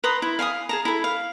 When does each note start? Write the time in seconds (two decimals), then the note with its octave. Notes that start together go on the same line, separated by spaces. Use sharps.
0.04 B4 A#5 C6 D#6
0.22 E4
0.39 F5 G#5 B5 D#6
0.69 G#4 A5 A#5
0.85 E4 A4
1.04 F5